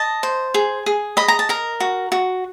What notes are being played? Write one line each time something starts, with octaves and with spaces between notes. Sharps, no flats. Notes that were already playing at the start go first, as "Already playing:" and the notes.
Already playing: D#5 A5
C5
G#4
G#4
D#5 B5
A#5
A5
A#4 A#5
F#4
F#4